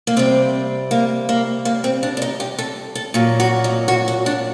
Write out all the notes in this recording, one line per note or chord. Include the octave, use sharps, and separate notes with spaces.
A#3
C3 G3 C4
A#3
A#3
A#3
C4
D4
D4
D#4
G4
A4
A4
A#2 F#3
F#4
D#4
F#4
F#4
D4